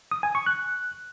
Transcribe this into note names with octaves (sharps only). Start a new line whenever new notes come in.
D#6
G#5
C#6
F#6